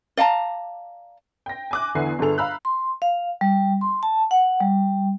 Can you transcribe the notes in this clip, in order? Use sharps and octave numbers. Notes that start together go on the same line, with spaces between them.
D5 F5 A5 A#5
G5 A#6
G#5 D6 F#6
E2 D3 B3 E4 G#5 C7
G1 D3 G#4 A4 F7
F5 A#5 B5 E6 F#6
C6
F5
G3
C6
A5
F#5
G3